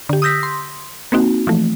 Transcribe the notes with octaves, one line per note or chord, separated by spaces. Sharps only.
D3 G4
D#6 E6 G6 A#6 B6
C6
A#3 C4 D#4 F#4
E3 F3 A3